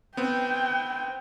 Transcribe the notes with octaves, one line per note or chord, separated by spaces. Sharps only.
B3 C4 G5